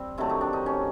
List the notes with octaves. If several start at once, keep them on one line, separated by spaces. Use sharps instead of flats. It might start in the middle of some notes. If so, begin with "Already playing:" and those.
Already playing: G3 C4
C3 D#3 F#3 A3 E4
D#4
D4
D#4
C#4